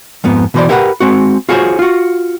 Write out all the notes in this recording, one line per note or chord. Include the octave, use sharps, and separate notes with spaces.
F2 G#2 B3
B2 E3 C5 D5
E4 G4 A#4 B4 F#5
G#3 C4 F#4
F4 F#4 G#4 A4 C5 C#5
F4 F#4